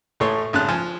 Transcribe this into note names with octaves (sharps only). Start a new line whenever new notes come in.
A1 A2 A3 C#5 C6 C#6
G#1 C#3 A5 F#6
F3 G#5